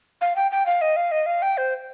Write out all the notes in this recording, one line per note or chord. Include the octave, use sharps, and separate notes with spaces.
F5
G5
G5
F5
D#5
F5
D#5
F5
G5
C5